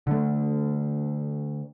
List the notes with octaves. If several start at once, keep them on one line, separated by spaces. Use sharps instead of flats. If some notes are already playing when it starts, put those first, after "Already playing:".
D3 A3